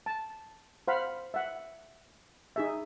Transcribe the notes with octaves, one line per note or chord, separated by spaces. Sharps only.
A5
C5 F5 F#5 B5
E5 F#5
D#4 G#4 E5